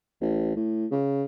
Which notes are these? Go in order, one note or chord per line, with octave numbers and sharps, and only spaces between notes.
A1
A2
C#3